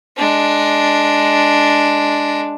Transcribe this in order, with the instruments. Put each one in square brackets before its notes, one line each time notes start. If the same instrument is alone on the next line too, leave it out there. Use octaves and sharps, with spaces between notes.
[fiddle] G#3 D4